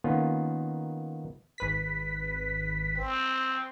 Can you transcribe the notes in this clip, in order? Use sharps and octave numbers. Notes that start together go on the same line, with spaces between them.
D#3 A#3 B3 C#4 F4
G#1 B4 B6
C4